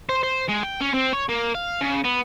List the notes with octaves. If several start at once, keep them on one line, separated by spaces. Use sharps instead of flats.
C5
C5
G#3
G5
C#4
C4
C#5
A#3
F5
C#3
B3